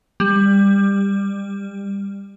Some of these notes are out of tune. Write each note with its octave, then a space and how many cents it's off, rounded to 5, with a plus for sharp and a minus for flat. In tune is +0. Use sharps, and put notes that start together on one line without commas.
G3 +25